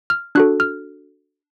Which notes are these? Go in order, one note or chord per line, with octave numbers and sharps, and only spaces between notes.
F6
D4 F#4 A4 F#6
F6